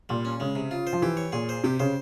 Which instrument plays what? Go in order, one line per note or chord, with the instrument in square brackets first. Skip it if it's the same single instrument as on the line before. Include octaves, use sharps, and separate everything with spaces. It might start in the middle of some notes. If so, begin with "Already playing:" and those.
[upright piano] A#2 [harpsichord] G3
[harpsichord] C#4
[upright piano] C#3 [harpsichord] G#3
[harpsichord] C3
F4
C5
[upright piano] F3
[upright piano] E3 [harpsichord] G4
[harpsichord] C#5
[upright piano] A#2 [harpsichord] G#4
[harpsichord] C5
[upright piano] C3 [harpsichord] G4
[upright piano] C#3 [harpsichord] C5